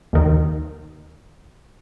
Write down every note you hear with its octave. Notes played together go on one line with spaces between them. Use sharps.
D#2 D#3